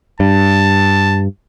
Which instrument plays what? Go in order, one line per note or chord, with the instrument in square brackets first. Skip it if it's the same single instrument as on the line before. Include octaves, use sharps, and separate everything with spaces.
[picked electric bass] G2 [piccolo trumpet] A5